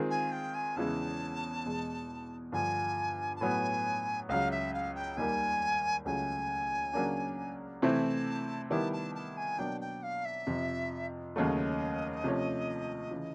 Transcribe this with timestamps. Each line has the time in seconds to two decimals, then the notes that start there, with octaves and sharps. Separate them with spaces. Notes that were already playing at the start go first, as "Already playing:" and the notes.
Already playing: D#3 G#3 C4 F4 G#4
0.10 G#5
0.32 G5
0.54 G#5
0.76 E2 C#3 E3 G#3 A5
1.65 E2 B2 G#3
2.52 G2 D3 F3 G#5
3.36 A5
3.41 A2 F#3 B3 G#5
4.29 C#2 C#3 F#3 F5
4.51 E5
4.74 F5
4.95 G5
5.17 D#2 D#3 G3 A#3 G#5
6.05 C#2 C#3 F#3 A3 G#5
6.93 C#3 F#3 A#3 D4
7.82 C3 E3 A3 C4 E4 A5
8.70 D#3 G3 B3 E4 G4 A5
8.93 A5
9.15 A5
9.37 G#5
9.58 B2 F#3 A#3 D4 G5
9.81 G5
10.03 F5
10.25 E5
10.47 F2 C3 F3
11.35 D#2 C#3 F#3 A3 D#5
12.24 C3 F3 A3 C#4
13.11 C#3 E3